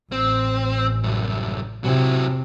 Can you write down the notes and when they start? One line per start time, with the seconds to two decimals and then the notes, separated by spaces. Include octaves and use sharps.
0.12 A1 C4
1.04 C2 F#2
1.84 C3 F#3 E4